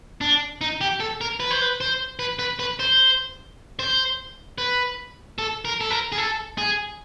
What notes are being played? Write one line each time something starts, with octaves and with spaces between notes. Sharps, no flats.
D4
D#4
G4
A4
A#4
B4
C5
B4
C5
B4
B4
B4
C5
C5
B4
A4
A#4
A4
A#4
G#4
A4
G#4